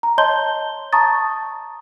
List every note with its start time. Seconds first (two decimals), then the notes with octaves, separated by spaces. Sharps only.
0.03 A#5
0.18 C#5 D#5 A5 C6 G6 G7
0.93 A5 A#5 C#6 D#6 A6